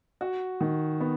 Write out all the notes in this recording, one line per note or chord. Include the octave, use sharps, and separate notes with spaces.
F#4
D#3
B3